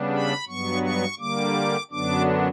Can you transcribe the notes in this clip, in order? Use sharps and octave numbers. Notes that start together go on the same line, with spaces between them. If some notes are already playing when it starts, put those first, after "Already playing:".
Already playing: C#3 G3 B3 D4
B5
G2 F#3 B3 C#6
C#6
D3 G3 A#3 D6
F#2 D3 F#3 B3 D4 D6